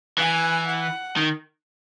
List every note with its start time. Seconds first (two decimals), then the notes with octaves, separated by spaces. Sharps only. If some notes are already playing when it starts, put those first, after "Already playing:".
0.18 E3 G#5
0.67 F#5
1.16 D#3